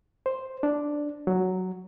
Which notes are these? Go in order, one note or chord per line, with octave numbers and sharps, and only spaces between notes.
C5
D4
F#3